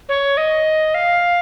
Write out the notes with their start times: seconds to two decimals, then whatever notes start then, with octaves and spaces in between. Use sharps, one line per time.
0.09 C#5
0.37 D#5
0.94 F5